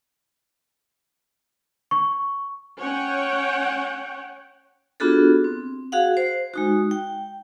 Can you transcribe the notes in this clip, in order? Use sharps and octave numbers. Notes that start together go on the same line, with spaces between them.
C#6
C#4 C#5 F#5 G5
B3 D4 F4 F#4 G#4 A4
C4
F#4 G#4 F5 F#5
C5
G#3 D#4 F#4
G5